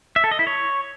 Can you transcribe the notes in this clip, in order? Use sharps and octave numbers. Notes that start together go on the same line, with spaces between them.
E5
A4
D#5
E4
C#5